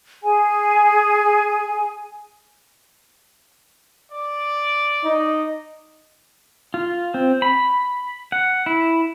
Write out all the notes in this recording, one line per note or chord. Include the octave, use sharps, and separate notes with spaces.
G#4 G#5
D5
D#4
F4
C4
B5
F#5
E4